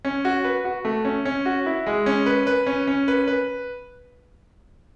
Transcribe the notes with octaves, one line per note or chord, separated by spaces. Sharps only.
C#4
F#4
B4
F#4
A3
C#4
C#4
F#4
E4
G#3
C#4
B4
B4
C#4
C#4
B4
B4